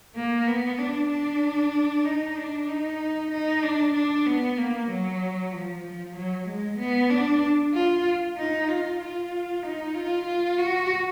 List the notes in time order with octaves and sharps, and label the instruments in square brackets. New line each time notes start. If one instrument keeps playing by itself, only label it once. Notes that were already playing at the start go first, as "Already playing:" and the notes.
[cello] A#3
B3
D4
D4
D#4
D4
D#4
D#4
D4
D4
B3
A#3
F#3
F3
F3
F#3
G#3
B3
D4
F4
D#4
F4
F4
D#4
F4
F4
F#4